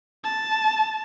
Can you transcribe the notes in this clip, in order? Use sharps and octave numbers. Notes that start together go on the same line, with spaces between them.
A5